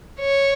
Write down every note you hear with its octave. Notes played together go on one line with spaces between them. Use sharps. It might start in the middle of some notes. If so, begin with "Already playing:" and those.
C#5